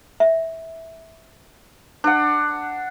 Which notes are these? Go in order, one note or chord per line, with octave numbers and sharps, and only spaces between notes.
E5
D4 F#5